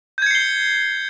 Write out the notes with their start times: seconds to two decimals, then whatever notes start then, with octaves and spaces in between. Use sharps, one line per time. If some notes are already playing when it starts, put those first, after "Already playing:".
0.18 G6
0.22 G#6
0.26 C#7
0.31 C7
0.35 G7